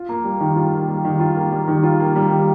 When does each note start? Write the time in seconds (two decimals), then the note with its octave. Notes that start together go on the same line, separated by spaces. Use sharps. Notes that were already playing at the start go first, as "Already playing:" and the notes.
Already playing: F4
0.09 A#3
0.24 G3
0.41 D#3
0.56 F4
0.73 A#3
0.88 G3
1.05 D#3
1.20 F4
1.36 A#3
1.52 G3
1.68 D#3
1.83 F4
2.00 A#3
2.15 G3
2.31 D#3